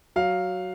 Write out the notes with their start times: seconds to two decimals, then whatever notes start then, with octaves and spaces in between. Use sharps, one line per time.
0.16 F#3 F5